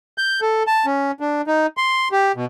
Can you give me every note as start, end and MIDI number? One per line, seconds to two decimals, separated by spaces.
0.18 0.40 91
0.42 0.63 69
0.67 0.86 81
0.86 1.11 61
1.20 1.42 62
1.47 1.66 63
1.77 2.08 84
2.12 2.32 67
2.36 2.45 47